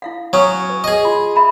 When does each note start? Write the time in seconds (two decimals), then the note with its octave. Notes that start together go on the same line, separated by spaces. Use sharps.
0.02 E4 F5 F#5
0.33 F#3 C#4 C#5 C#6 D#6
0.70 B4
0.84 G#4 D#5
1.05 F4 C6
1.36 E5 A#5 B5